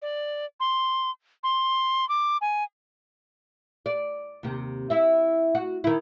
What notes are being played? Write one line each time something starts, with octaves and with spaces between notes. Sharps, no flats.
D5
C6
C6
D6
G#5
D5
D#2 C3
E4 E5
F#4
D#3 E4